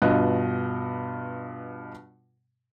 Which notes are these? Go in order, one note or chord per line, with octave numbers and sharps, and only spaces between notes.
G2 B2 F4 D#5 F#6